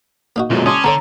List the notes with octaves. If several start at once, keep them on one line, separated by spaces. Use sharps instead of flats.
A#3 D#4 F#4
B1 F#2 A#2 F#3 G#3
C#3 C#4 A5 C6 D6 D#6
D3 B3 A4 C#5 A#5